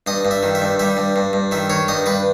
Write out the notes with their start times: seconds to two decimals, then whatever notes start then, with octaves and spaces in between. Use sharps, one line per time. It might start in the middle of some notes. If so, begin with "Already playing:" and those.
0.07 G2 D#5
0.25 G2
0.31 E5
0.43 D#3
0.55 E5
0.62 G2
0.79 G3 E5
0.97 G2
1.16 G2
1.33 G2
1.51 D#3 E5
1.70 D#3 C#5
1.88 G2 D#5
2.06 G2 B4